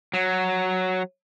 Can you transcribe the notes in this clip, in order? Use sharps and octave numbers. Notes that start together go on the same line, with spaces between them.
F#3